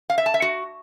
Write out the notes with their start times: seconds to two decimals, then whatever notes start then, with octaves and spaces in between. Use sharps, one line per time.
0.10 F5
0.18 E5
0.26 A5
0.34 E5
0.42 F#4